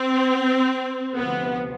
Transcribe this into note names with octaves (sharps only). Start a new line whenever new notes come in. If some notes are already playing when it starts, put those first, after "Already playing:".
Already playing: C4
D2 C3 F3 B3